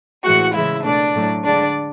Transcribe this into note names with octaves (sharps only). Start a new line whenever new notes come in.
A2 E3 G#3 F#4 F#5
C#3 E3 G#3 E4 E5
B2 A3 D4 D5
A2 F#3 A3
D3 G#3 D4 D5